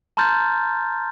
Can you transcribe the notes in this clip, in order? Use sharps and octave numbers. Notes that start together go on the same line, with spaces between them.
A5 A#5 C6 F6 G6 A6